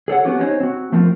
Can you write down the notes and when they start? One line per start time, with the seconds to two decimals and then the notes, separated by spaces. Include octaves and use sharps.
0.08 G#4 A4 C#5 F#5
0.25 B3 C#4 F#4 G4
0.39 C4 C#4 D#4 C5 C#5
0.60 C4 F#4
0.92 F3 A3 C4 F4 A#4